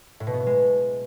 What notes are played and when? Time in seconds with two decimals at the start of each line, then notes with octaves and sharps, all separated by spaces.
0.20 A2
0.27 B2
0.33 B3
0.40 A2
0.47 G#3